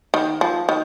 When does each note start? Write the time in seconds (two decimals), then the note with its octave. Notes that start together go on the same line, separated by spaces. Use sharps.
0.14 D#3
0.41 F3
0.69 D#3